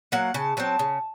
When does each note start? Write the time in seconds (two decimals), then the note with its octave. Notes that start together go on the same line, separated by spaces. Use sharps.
0.12 F#3 A#3 F#5
0.34 C#3 A5
0.57 F#3 C4 A5
0.79 C#3